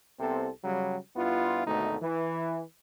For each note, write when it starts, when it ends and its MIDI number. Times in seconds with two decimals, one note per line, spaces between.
0.19 0.49 36
0.19 0.49 48
0.19 0.49 59
0.19 0.49 60
0.19 0.49 69
0.64 0.98 49
0.64 0.98 54
0.64 0.98 55
1.17 1.63 43
1.17 1.63 59
1.17 1.63 64
1.17 1.63 65
1.67 1.96 32
1.67 1.96 38
1.67 1.96 47
1.67 1.96 57
1.67 1.96 63
2.02 2.63 52